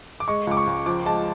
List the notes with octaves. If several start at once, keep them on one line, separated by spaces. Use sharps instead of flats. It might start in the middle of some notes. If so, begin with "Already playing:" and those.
D6
G#3 C#6
C#2 D6
C#6
C#2
F3 D6
G#3 A5